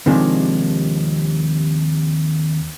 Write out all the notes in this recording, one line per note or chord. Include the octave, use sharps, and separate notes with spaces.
D#2 C3 D#3 F3 G#3 D4